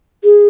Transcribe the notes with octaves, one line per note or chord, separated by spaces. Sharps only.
G#4